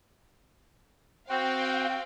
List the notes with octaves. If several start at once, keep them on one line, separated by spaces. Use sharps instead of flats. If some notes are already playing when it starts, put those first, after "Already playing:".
C4 F#4 F5 G5